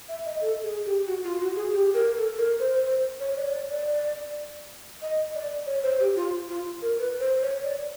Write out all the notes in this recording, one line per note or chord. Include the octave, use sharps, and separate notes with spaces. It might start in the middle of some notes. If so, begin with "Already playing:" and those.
E5
D#5
A4
G#4
G4
F#4
F4
F#4
G#4
G4
A#4
A4
A#4
C5
C5
C#5
D5
C#5
D5
D5
D#5
D5
C#5
C5
G4
F4
F4
A#4
B4
C5
C#5
D5